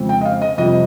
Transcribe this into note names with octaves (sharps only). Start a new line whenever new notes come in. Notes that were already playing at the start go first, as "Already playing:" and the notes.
Already playing: F2 C#3 G#3 C4
G5
D#5
F5
D#5
F2 C3 G3 D#5